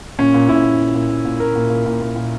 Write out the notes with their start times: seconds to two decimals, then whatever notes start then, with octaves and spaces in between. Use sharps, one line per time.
0.19 A#2 C#4
0.34 A#2
0.48 A#2 E4
0.64 A#2
0.79 A#2
0.95 A#2
1.09 A#2
1.25 A#2
1.40 A#2 A#4
1.55 A#2
1.70 A#2
1.86 A#2
2.01 A#2
2.16 A#2